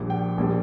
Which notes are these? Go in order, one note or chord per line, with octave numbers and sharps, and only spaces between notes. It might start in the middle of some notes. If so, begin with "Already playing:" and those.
Already playing: A#1 A#2 G3
G5
A#1 A#2 G3